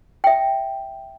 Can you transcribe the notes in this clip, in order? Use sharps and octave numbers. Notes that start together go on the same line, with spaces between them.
E5 G5